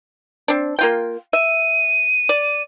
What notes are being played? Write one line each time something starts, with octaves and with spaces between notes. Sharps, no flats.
C4 D4
A#3 F4 G5
E5 D#7
D5